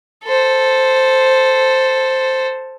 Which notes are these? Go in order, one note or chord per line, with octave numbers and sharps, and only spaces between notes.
A4 C5